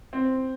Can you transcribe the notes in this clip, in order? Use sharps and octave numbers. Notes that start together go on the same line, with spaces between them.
C4